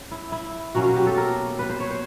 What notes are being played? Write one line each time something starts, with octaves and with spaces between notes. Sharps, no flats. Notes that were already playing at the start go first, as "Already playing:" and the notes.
Already playing: C#4
E4
E4
B2 F#3 A#3 C#4 F#4
F#4
G4
A4
A#4
B4
C5
C#5
C5